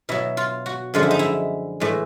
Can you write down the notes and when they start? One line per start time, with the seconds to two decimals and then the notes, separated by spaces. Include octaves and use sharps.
0.09 B2 F#3 E4
0.37 F4
0.66 F#4
0.94 F#2 D3 F3 G#3 F4
1.03 E4
1.11 D#4
1.19 E4
1.80 A2 E3 G#3